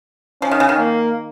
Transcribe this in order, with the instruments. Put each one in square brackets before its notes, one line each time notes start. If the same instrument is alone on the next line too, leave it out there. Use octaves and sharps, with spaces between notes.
[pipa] F3 [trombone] C#4
[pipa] D#3
C#3
D#3
[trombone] A#3